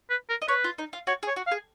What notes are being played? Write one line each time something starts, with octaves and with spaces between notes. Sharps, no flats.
B4
A#4
D#5
B4 C#5
F4
D#4
F4
F#4 C#5
G#4
C#5
F#4
F5
G#4